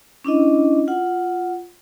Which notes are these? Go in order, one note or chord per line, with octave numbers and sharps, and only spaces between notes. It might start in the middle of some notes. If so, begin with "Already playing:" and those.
C#4 D4 E4 D#5
F4 F#5